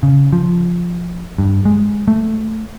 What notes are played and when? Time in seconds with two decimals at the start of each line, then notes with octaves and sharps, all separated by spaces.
0.03 C#3
0.33 F3
1.38 G2
1.65 G#3
2.08 A3